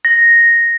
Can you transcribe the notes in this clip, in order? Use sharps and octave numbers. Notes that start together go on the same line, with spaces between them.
A#6